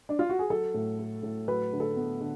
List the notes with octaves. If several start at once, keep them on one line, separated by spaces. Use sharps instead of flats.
D4
F4
F#4
G#4
F#3 A4
A2
A3
A2
F#3 B4
D3
A4
B3
D3